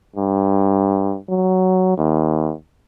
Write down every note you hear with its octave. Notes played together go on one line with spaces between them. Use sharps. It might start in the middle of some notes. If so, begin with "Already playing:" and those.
G2
F#3
D#2